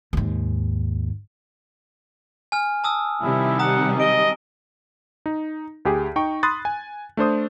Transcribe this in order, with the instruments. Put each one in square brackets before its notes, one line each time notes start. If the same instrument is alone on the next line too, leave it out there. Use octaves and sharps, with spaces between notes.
[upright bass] D#2 G#2
[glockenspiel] G#5 F6
A5 D#6 E6
[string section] C3 D#3 G3 [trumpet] E4
[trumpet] F#5 [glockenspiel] A#5 D#6
[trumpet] D#5 [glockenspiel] D7 G7
[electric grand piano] D#4
D2 G4 G#4
D#4 G5 C#6
B5 C6 D#6 F#6 A6
G#5
A3 D4 C5 D#6